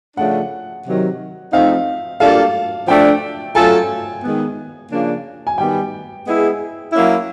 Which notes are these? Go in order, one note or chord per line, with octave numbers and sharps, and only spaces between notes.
C#3 F3 A3 D4 F#5
C3 D#3 F#3
F3 A3 C4 D#4 F5
G3 A#3 D4 F4 A4 F5
F3 A3 D4 G5
F#3 A3 C#4 F4 A4 G#5
D#3 G#3 B3
C#3 F3 A#3 D4
G#5
D#3 G3 B3 G5
G#3 B3 E4 G#4
F#3 A#3 C#4 E4